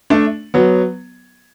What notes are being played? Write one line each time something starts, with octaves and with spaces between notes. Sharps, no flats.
A3 D4
F#3 B3